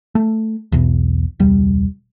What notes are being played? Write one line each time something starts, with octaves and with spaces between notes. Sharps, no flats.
A3
E1 B1 E2
E1 C#2 G3